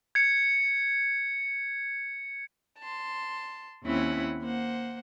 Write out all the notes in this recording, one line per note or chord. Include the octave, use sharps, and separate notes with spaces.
G#6 C#7
A5 C6
D#2 C4 C#4 E4 F#5 B5
A#3 C5 F#5